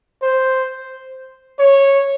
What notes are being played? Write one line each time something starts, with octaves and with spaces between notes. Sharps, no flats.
C5
C#5